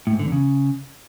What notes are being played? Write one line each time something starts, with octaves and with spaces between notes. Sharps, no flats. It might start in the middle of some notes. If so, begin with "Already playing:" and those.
A2
G#2
D3
E2
C#3